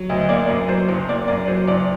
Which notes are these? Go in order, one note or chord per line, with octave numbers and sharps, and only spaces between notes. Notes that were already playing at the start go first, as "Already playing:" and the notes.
Already playing: F#3
D2 D#5
D#5
A#3 D5
F#2
F#3 C5
F#1
A#3 D5
F#2 D5
F#3 C5
F#1 D5